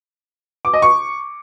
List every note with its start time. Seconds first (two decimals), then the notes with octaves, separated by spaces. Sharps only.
0.65 D6
0.73 D#5
0.82 C#6